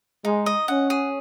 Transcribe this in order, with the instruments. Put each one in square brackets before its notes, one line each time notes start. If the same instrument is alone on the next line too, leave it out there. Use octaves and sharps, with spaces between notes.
[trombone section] G#3 [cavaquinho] D#4
[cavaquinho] D#5
[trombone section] C#4 [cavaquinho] F#5
[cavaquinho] G#4